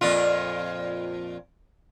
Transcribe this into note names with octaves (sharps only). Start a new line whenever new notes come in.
F2 A#2 F4